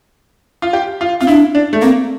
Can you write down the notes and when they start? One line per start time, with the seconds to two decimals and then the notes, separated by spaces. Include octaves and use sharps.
0.62 F4
0.73 G4
1.01 F4
1.21 C4 F4
1.27 D4 E4
1.55 D4
1.73 A3
1.82 A#3 C4